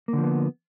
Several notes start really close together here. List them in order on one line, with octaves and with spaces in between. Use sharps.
A#3 D3 F3 B3